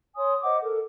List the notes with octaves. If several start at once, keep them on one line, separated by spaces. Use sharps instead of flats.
C#5 G#5 C6 D#6
C5 D#5 F#5 D6
A4 A#4